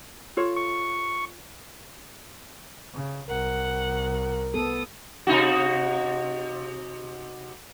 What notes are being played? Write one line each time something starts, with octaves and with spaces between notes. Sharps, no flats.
F4 A4 C#5
C#6
C#3
C2 A#4 F#5
B3 A4 D#6
C3 D#4 F#4